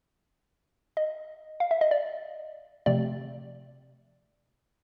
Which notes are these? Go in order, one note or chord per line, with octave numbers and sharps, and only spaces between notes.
D#5
F5
E5
D#5
D5
C3 F3 A3 C4 D5